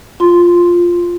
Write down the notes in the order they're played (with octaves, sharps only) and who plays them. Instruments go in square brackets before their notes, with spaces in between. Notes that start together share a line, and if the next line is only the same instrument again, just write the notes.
[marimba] F4 C6